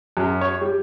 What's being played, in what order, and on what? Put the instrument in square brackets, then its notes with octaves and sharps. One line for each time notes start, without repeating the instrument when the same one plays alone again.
[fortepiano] F#2
C#5
G3